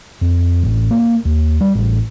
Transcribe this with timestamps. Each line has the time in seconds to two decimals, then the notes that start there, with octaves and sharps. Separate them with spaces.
0.21 F2
0.63 A1
0.91 A#3
1.25 D#2
1.61 G3
1.75 A1